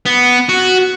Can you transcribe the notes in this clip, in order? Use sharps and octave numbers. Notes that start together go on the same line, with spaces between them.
B3
F#4